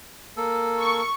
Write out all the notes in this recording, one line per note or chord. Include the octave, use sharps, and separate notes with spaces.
A#3 A4
C#6